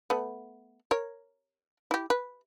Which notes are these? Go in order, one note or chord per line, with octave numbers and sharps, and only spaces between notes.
A3 B3
A#4 C#5
E4 G4
B4